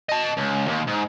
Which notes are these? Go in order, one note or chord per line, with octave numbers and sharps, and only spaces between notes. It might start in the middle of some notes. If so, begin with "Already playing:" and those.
D#5 A5
C#2
D#2
G#2